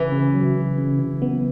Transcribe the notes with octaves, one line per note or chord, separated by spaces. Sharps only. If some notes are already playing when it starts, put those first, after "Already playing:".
Already playing: C#3 E3
C#3
F#3
C#3
C#3
C#3
B3